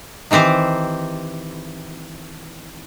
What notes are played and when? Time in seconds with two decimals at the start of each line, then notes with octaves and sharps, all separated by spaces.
0.31 D#3 E3 C4 G4 C5